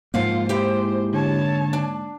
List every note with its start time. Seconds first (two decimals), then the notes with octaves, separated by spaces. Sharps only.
0.14 G#2 F3 A#3 F4 F5 F#5
0.49 G#3 E4 G4 C5
1.13 D3 C#5 A5
1.73 D4